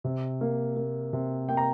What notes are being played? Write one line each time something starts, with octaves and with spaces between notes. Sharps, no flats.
C3
A#3
A#3
C3
A#3 G5
A#5